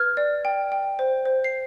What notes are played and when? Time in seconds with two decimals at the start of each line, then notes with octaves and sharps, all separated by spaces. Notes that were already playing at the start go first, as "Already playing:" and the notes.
Already playing: B4 F6 G#6
0.17 D5
0.45 G5
0.72 G5
0.99 C5
1.25 C5
1.44 C7